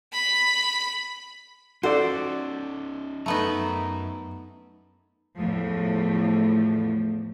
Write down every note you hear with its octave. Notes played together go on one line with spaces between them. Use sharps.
B5
C#4 D#4 F#4 A4 C5 D5
F#2 A3 B3 D#4 A#5
E2 A2 F3